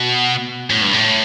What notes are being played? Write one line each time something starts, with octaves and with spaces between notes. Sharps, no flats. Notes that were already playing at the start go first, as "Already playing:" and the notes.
Already playing: B2
A2
G2
A2